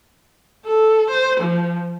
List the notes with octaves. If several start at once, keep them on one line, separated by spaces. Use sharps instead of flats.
A4
C5
F3